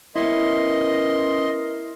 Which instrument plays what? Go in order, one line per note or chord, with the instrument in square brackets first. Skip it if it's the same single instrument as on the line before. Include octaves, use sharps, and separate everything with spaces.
[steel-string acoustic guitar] B3 C#4 C5 [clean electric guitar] E4 [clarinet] A#4 [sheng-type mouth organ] D#5 C6